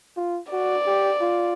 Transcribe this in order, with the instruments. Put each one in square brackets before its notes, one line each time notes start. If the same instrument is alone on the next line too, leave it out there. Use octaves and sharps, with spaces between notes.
[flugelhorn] F4
[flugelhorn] F#4 [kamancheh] D5
[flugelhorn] G4
F4